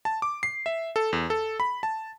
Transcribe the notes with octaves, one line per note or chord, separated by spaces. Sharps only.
A5
D6
C7
E5
A4
E2
A4
B5
A5